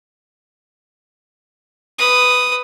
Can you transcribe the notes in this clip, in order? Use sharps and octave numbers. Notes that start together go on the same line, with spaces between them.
B4 D#6